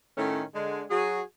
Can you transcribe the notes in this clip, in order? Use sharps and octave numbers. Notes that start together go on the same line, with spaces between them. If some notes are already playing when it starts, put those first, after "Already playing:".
A2 D#3 A3 C#4
D3 G#3
F#3 F#4 G#4